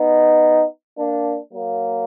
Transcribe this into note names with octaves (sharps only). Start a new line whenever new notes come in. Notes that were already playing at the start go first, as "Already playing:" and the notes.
Already playing: B3 D#4
A#3 D4
F#3 A#3